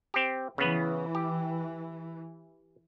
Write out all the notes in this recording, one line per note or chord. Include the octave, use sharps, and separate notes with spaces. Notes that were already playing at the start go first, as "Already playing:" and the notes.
C4 G4
C#3 E3 B3 B4
G4